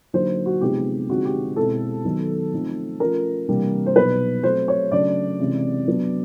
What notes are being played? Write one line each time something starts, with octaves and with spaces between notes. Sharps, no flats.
D3 F#3 A#3 D#4 C5
F#4
C3 F3 G#3 B3 D#4 G4
D3 F3 G#3 C4 D#4 F#4
G4
B2 G#3 C4 E4 A4
D#3 F#3 B3 D#4
F3 A3 C4 D#4
F3 A3 C#4 A#4
C3 E3 G3 A#3 D4
C5
B2 F#3 B3 D#4 B4
F#3 A3 C4 C5
C#5
C#3 F#3 A3 D4 D5
C3 E3 G#3 C#4 E4
F#3 B3 D4